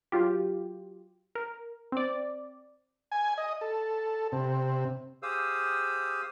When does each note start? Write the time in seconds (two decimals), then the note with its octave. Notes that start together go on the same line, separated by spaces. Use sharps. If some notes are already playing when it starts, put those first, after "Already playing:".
0.12 F#3 F4 G4
1.35 A#4
1.92 C4 D5
3.12 G#5
3.38 D#5
3.61 A4
4.32 C3
5.23 G4 G#4 C5 F5 D#6 E6